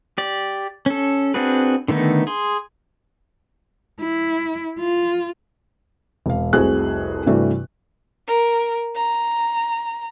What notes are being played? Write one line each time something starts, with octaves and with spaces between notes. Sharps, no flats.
G4 D5
C#4 A4
C4 D4 F#4 G#4 B4
D3 D#3 A3 B3 D#4
G#4 C6
E4
F4
E1 F5
F1 C2 F#4 G#4 C5 F#6
G2 C3 E3 A3 F#4 D5
A#4
A#5